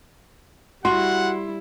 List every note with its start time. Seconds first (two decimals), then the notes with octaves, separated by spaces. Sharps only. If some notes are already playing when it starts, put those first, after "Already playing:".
0.85 G3 E4 F#4 F#5 C6